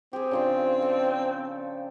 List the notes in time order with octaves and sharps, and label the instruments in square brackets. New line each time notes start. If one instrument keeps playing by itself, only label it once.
[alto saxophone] C4 [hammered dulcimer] G4 G#4
[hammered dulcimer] C#3 F3 D4
A4 G5